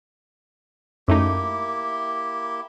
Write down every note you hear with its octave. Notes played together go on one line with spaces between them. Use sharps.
F#2 A3 A#3 D#4 E4 G4